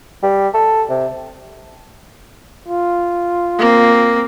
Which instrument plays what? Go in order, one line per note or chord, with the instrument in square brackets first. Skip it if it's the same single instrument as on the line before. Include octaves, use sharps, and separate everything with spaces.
[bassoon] G3
A4
C3
[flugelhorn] F4
[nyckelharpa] A#3 C4